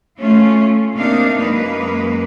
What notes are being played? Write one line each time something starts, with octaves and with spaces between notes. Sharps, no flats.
A3 C#4 F4
C3 A#3 D4 D#4 F5
F#2 G#3 A#3 B4